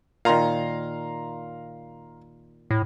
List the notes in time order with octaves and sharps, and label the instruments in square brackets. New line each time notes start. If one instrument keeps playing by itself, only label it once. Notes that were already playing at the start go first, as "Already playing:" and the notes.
[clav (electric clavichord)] A#2 D#3 [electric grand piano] F5 A#5 C6
[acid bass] A2